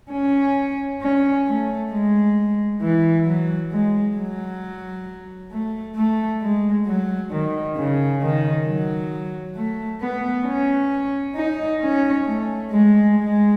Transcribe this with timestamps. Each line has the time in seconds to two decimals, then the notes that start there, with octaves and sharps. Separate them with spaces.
0.12 C#4
1.01 C#4
1.47 A3
1.91 G#3
2.81 E3
3.26 F#3
3.71 G#3
4.16 F#3
5.51 A3
5.96 A3
6.42 G#3
6.86 F#3
7.31 D#3
7.76 C#3
8.21 D#3
8.66 F#3
9.56 A3
10.01 B3
10.46 C#4
11.36 D#4
11.81 C#4
12.26 A3
12.71 G#3
13.16 G#3